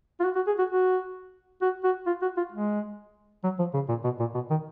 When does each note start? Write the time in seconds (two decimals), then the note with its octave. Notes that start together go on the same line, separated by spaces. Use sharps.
0.20 F4
0.24 F#4
0.36 F#4
0.47 G#4
0.59 F#4
0.70 F#4
1.62 F#4
1.84 F#4
2.07 F4
2.22 F#4
2.37 F4
2.52 G#3
3.44 F#3
3.59 F3
3.74 C#3
3.89 A#2
4.04 B2
4.20 A#2
4.35 B2
4.50 D#3